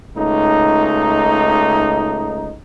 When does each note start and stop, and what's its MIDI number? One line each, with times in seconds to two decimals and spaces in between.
0.17 2.55 37
0.17 2.55 57
0.17 2.55 63